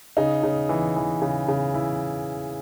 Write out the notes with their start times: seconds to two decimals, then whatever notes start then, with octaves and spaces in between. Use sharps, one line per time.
0.17 C#3 D#4
0.43 C#3
0.69 E3
0.96 E3
1.22 C#3
1.48 C#3
1.74 E3 E4